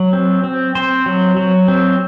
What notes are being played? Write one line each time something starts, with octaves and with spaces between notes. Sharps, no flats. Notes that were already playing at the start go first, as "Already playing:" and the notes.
Already playing: F#3
C4
C4
C4 C5
F#3
F#3
C4